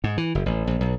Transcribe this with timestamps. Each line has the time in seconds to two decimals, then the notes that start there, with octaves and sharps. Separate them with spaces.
0.04 G#2
0.18 E3
0.35 F#1
0.46 A1
0.67 A#1
0.81 B1